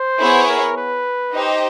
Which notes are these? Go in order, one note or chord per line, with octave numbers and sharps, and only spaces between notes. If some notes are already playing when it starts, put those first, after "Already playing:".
Already playing: C5
B3 E4 G#4 C#5
A#4
B4
D#4 G4 C5 D#5